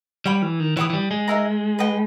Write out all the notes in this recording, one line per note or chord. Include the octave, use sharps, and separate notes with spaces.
G3 C#5 G5 B5
E3
D#3
E3 C#5 G5 B5 D#6
E3
G3
G#3
D#4 A#4 E5 A#5
B4 D#5 G5 B5